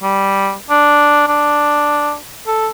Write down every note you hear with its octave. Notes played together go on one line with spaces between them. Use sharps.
G3
D4
D4
A4